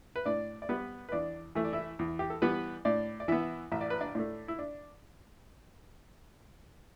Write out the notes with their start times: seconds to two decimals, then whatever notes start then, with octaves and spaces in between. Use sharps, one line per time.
0.16 B4
0.25 A2 D4 D5
0.62 D5
0.69 G3 B3 B4
1.09 B4
1.12 E2 D4 D5
1.55 E3 A3 E5
1.65 D5
1.73 E4 E5
1.99 E2
2.19 G4
2.30 A4
2.42 E3 G3 B3 B4
2.85 A2 D4 D5
3.20 D5
3.28 E3 B3 E4 E5
3.72 A1 E5
3.81 D5
3.90 B4
4.01 D4 D5
4.15 A2 A3 D4
4.48 E4
4.59 D4